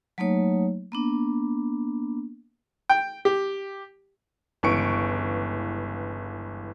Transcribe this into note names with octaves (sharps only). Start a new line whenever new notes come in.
F#3 A3 A#3 D#4 C#5
A#3 B3 D4
G5
G4
G1 C#2 E3 C#6 C#7 D7